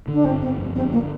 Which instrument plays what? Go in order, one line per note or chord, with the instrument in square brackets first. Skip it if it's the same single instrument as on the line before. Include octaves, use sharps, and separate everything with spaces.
[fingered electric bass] D3
[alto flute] D4
[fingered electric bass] G1 [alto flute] C4
[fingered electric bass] G1 [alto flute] C4
[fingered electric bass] F2
[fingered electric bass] D3 [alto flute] C4
[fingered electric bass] G1 [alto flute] A#3